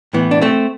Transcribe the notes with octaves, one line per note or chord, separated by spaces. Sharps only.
A2 E3 B3
D4
A3 C4